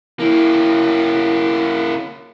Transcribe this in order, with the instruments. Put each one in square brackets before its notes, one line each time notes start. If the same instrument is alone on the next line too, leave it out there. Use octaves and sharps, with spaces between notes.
[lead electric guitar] A#3 C#4 [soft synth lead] E4